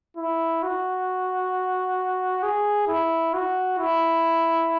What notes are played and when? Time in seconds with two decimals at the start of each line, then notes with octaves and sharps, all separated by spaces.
0.17 E4
0.63 F#4
2.43 G#4
2.88 E4
3.33 F#4
3.78 E4